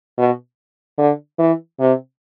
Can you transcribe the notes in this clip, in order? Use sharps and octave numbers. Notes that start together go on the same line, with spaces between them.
B2
D3
E3
C3